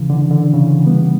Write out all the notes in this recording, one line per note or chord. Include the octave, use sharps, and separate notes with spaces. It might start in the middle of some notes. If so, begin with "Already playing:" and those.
Already playing: C#3 E3
D3
D3
C#3 E3
G3 B3